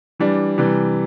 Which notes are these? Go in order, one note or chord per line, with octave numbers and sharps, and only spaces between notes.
E3 G3 D4
C3 E3 G3